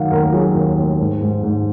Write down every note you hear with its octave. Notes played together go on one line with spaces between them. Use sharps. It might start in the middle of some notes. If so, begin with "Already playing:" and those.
Already playing: D#3 F#3 F5 F#5
D#2 A#4
F#3 G#4
D#2
D#2
G#2
G#2
G#2